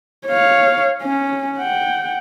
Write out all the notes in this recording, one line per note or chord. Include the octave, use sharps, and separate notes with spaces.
C#5 F5
C#4
F#5 G5